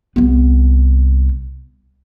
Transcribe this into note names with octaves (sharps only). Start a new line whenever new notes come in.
C2 B3